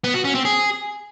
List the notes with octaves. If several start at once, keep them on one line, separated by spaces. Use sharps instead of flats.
B3
F#4
C#4
C4
G#4